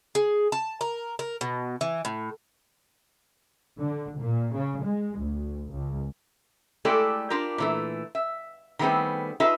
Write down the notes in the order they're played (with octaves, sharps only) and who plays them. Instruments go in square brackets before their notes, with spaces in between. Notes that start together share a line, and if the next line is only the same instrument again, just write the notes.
[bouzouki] G#4
A5
A#4
A#4
B2
E3
A2
[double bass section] D3
A#2
C#3
G#3
D2
C#2
[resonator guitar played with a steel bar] G#3 A3 E4 G4 A4 D5
D4 F4 G4 A#4
A#2 E3 A3
E5
D#3 G3 A3 B3 C4 G#4
D#4 F4 G#4 A4 B4 E5